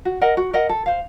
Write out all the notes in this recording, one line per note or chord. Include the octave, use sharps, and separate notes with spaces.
F#4
A#4 D#5 F#5
F#4
A#4 D#5 F#5
A4
C5 F5